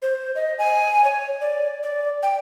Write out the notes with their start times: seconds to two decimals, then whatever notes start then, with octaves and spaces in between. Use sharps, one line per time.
0.02 C5
0.35 D#5
0.59 G#5
1.04 C#5
1.41 D5
1.83 D5
2.23 G5